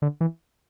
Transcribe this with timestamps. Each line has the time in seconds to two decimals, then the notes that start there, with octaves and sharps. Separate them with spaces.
0.02 D3
0.21 E3